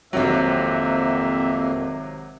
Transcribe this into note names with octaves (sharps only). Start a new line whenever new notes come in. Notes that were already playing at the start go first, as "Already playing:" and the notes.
G#1 F2 C3 F#3 A#3 C4 E5